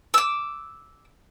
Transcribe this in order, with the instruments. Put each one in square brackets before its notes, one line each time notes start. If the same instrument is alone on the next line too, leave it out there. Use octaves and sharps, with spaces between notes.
[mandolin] D6 E6